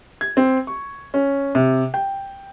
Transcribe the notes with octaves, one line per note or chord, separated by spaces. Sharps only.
G#6
C4
C#6
C#4
C3
G5